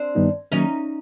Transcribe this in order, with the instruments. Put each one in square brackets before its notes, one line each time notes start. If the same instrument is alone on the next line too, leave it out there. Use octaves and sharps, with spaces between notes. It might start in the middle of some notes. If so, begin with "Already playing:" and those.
Already playing: [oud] C4 D4
[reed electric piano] G2 D#3 G3 B3 D#4
[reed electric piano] D#3 F#3 A#3 [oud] C#4 D#4